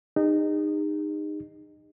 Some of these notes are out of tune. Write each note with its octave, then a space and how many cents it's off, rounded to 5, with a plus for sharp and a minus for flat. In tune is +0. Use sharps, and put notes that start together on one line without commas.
D#4 -20 G#4 -45